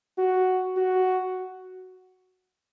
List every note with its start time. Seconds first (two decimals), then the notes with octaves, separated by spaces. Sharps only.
0.18 F#4
0.77 F#4